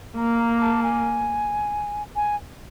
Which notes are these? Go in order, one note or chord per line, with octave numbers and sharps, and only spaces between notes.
A#3 A#5
A#5
A5
G#5
G#5